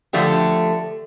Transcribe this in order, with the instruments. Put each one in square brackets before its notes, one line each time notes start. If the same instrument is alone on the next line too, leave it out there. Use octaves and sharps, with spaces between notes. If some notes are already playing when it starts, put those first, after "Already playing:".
[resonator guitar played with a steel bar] D3 F3 A3 D4 G4